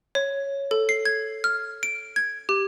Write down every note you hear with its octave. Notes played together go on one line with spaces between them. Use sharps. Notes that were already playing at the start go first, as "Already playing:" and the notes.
C#5
A4
C7
G#6
F6
D7
G#6
G4